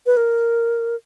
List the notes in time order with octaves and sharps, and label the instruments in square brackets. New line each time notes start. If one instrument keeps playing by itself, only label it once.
[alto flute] B4
A#4